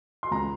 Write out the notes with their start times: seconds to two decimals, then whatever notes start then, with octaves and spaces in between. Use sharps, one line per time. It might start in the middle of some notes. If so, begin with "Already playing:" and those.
0.23 C6
0.31 C#2 A#5